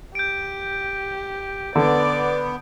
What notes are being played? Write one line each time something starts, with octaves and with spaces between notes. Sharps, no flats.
G4 G6 D7
D3 B3 D5 D6